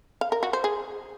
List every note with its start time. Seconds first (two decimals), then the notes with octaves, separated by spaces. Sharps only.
0.21 F5
0.32 A#4
0.43 F#4
0.53 C5
0.64 G#4